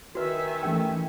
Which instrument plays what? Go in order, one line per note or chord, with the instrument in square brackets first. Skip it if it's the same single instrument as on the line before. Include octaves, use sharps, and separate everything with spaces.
[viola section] D#3 E5 G#5 [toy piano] F#4 B4
[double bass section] E3 A3 [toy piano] C#4 G4 G5